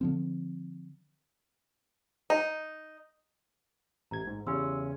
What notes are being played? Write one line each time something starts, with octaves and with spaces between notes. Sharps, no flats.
D3 F3 C4
D#4
A1 A#5 G#6
G#2
E2 C#3 C#4 G4 C6 E6